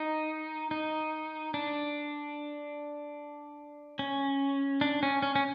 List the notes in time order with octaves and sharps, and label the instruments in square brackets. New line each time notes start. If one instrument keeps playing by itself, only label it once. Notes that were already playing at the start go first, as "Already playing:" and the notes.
Already playing: [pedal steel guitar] D#4
D#4
D4
C#4
D4
C#4
C#4
C#4